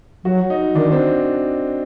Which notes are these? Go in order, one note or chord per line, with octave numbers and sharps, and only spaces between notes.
F#3 F#4
D#4
D#3 D4
C4